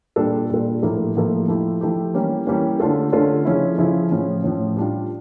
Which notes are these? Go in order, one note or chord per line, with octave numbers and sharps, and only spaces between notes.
A#2 G3 D4 F4 A4
A#2 G3 D4 F4 A4
A2 F3 A#3 E4 A4
A2 F3 A#3 E4 A4
F3 A3 E4 G4
F3 A3 E4 G4
E3 G3 A#3 C#4
E3 G3 A#3 C#4
D3 A3 C#4 F4 A4
D3 A3 C#4 F4 A4
C#3 F3 C#4 E4
C#3 F3 C#4 E4
A2 F3 C#4
A2 F3 C#4
G3 D4 F4